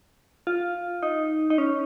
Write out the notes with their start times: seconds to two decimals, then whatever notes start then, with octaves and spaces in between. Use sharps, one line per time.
0.47 F4
1.03 D#4
1.50 D#4
1.58 C#4